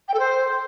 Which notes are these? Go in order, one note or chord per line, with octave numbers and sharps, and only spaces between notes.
G5
A4
C5